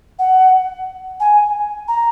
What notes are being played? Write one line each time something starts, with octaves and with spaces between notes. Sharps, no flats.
F#5
G#5
A#5